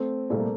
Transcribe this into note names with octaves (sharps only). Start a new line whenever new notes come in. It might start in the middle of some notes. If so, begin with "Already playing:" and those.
Already playing: A3 C4
C2 A#2 G3 A3
A#3